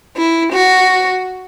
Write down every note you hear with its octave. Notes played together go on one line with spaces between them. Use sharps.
E4
F#4